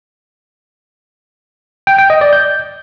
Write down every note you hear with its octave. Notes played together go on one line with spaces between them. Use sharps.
G5
G5
D#5
D5
G6